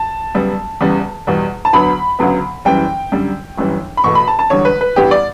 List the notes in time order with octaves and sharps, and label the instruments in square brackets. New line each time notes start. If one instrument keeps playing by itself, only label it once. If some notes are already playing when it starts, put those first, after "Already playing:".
Already playing: [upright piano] A5
F#2 C#3 G3 B3
E2 C#3 G3 B3
E2 B2 G3
A5
D2 D3 F#3 B3 B5
D2 C#3 F#3 B3
F#1 F#2 E3 G3 G5
F#2 D3 G3
G1 F#2 E3 G3
B5
E2 B2 A3 C#6
B5
A5
A5
E1 E2 D3 G3 C#5
B4
B4
A1 G2 E3 G3 B3 G4
D5